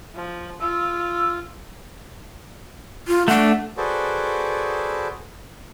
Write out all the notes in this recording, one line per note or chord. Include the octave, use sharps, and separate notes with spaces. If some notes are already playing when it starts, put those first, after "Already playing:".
F3
F4 E6
F4
A3 D4 F#5
F#4 G#4 A4 B4 C5 D5